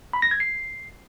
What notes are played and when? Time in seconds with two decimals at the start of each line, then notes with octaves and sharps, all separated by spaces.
0.13 B5
0.22 A#6
0.31 G#6
0.40 C7